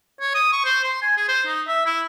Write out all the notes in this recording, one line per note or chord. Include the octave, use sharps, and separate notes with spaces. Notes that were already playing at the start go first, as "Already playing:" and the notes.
C#5
D#6
C#6
C5
C6
G#5
G#4
C5
D#4
E5
E4